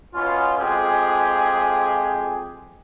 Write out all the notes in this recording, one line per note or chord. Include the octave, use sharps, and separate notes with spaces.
B2 C#4 F4
F2 F3 G#3 G4 G#4